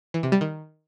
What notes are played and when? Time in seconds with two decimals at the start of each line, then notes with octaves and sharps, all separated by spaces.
0.14 E3
0.23 C3
0.32 G3
0.41 D#3